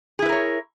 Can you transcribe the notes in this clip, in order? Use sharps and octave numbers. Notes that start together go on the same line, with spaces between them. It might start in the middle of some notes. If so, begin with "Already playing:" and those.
E4 G#4 A#4 B4 C#5